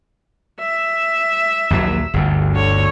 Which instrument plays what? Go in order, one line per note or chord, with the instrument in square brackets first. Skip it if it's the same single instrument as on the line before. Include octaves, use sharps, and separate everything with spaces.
[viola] E5
[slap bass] A#1 D#2 F#3
G1 D2
[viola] D3 C#5